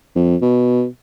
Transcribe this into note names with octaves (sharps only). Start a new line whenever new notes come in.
F2
B2